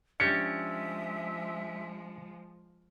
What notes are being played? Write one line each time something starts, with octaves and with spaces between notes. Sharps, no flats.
F3 G#3 C#4 D4 G4 E5 C#7